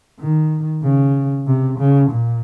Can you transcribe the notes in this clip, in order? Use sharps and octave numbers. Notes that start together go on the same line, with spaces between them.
D#3
C#3
C3
C#3
A#2